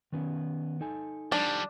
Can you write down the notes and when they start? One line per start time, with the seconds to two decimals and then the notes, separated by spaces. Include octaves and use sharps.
0.12 D#3 B3 C#4
0.81 D#4 A4 G#5
1.32 F3 G3 D4